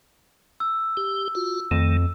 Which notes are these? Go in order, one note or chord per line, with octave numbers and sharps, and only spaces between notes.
E6
G4
F4 F#4
F2 D#3 A3